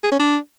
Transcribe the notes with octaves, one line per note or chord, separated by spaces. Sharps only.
G#4
C#4
D4